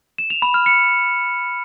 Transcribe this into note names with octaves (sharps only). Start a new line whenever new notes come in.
E7
F7
B5
F6
C#7